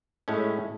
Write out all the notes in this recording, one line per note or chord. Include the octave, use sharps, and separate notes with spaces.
A2 G#3 C#4 E4